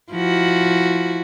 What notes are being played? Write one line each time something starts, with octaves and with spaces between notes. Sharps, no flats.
F3 E4 F#4